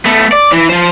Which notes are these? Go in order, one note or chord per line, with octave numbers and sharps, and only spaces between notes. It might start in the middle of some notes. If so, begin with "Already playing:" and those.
A3 B3
D5
E3
F3 C5